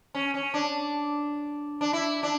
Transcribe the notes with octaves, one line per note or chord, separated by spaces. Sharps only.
C#4
C#4
D4
D4
E4
D4